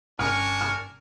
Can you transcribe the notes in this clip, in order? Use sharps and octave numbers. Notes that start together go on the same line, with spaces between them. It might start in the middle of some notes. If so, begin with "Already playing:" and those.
G1 C#4 D4 A#4 G#5 C#6 F6
F6